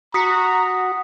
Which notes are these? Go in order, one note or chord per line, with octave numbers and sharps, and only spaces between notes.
F#4 A#5 D#6 B6 C#7